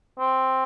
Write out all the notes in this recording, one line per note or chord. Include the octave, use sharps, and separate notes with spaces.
C4